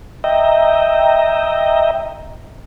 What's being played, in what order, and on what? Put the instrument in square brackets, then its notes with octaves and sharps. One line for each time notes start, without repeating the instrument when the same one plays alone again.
[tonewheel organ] D#5 E5 G5 A#5